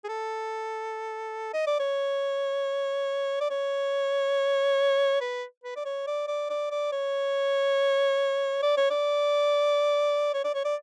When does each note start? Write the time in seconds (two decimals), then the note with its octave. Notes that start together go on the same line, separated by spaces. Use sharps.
0.04 G#4
0.08 A4
1.53 D#5
1.66 D5
1.79 C#5
3.40 D5
3.50 C#5
5.21 B4
5.64 B4
5.76 D5
5.85 C#5
6.07 D5
6.27 D5
6.49 D5
6.71 D5
6.92 C#5
8.62 D5
8.77 C#5
8.90 D5
10.34 C#5
10.44 D5
10.54 C#5
10.65 D5